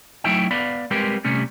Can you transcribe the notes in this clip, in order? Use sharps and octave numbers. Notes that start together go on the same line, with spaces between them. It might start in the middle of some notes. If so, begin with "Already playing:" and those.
F#3 A3 D#4 E4 E5 G5
B3 D5 F5 B5
G3 G#3 C4 G4 A#4 B4
C3 G3 A3 C#4